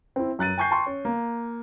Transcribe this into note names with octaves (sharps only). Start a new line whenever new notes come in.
C4 E4
F#2 F#6 A6 D#7
G5 G#5 C#6 G6 C7
G5 A5 C6 C#6
C#4
A#3